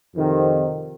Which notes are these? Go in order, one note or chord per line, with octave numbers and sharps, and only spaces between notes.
F2 C3 D#3